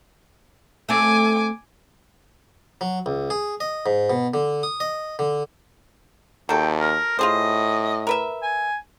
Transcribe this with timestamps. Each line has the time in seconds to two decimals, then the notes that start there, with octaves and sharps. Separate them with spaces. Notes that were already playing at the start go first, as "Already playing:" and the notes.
0.89 A3 C4 G#5 D6
2.81 F#3
3.06 C#2
3.30 G#4
3.60 D#5
3.86 G#2
4.10 B2
4.34 D3
4.63 D#6
4.80 D#5
5.19 D3
6.49 D#2 F#3 A4 G5
6.80 A#4
7.19 A2 F4 G#4 C5 D#5
8.07 A#4 B4 E5
8.43 G#5